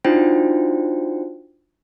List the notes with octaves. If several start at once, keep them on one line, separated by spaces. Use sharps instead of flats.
D4 D#4 F4 F#4 C5 G5